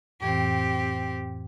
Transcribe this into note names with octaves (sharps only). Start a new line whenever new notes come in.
F2 A2 E3 C4 G4